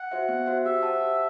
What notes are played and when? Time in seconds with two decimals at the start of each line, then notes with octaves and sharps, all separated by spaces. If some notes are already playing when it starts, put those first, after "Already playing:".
Already playing: F#5
0.12 F#4 C5 E5
0.29 B3
0.46 F#4 C5 E5
0.65 G4 E5
0.83 C5 F#5 A5
1.02 G4